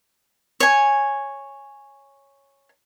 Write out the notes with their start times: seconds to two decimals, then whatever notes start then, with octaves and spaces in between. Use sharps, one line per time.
0.60 C#5 G#5